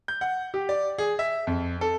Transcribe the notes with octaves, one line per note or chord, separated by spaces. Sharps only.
G6
F#5
G4
D5
G#4
E5
F2
A4